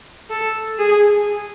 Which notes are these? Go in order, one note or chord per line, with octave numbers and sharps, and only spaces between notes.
A4
G#4